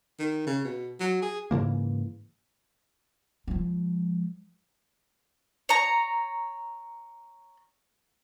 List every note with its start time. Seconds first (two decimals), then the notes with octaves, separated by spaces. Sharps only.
0.19 D#3
0.47 C#3
0.64 B2
1.00 F#3
1.22 G#4
1.51 G#2 C#3 E3 A#3
3.47 F3 G#3
5.69 C#5 A#5